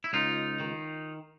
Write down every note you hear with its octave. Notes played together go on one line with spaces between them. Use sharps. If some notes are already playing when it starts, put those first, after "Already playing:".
E4
C#2 D#4 F4
D#3